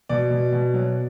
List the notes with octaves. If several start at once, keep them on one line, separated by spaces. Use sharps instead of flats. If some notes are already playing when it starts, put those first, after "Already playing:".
B2 D5
B2
B2
F#3